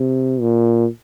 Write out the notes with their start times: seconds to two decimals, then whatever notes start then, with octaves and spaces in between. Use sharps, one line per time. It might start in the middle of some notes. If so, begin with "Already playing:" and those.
Already playing: C3
0.41 A#2